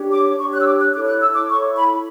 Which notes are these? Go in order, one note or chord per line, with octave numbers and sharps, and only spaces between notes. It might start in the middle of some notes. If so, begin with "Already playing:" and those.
Already playing: D4 G4 C#5
D6
D4 G4 C#5 C#6
F#6
E6
D6
F#6
E4 A4 C#5 D6
F#6
E6
D6
E4 A4 C#5 C#6
B5